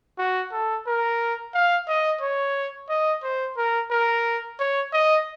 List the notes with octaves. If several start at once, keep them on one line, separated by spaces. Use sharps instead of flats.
F#4
A4
A#4
F5
D#5
C#5
D#5
C5
A#4
A#4
C#5
D#5